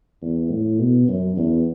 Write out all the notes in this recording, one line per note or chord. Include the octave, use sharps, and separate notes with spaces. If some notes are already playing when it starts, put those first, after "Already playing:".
E2
A2
B2
F#2
E2